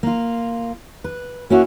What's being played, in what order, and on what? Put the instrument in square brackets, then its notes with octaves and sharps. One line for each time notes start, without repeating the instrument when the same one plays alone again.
[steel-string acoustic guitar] A#3 F4
B4
[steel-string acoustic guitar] A#3 C#4 E4 [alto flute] F#4